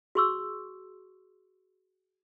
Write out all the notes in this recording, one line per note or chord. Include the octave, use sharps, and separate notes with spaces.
F#4 G#4 C6 C#6 E6